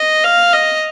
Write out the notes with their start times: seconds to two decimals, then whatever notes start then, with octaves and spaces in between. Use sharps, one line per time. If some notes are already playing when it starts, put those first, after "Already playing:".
Already playing: D#5
0.24 F5
0.53 D#5